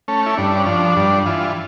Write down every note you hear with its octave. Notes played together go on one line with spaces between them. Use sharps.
A3 C#4
E4
G2 D4
C#4
F3 D4
G2
E3 F4